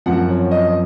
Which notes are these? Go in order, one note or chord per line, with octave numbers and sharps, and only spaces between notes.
F#2 F3 C4 F#5
C#5
D#5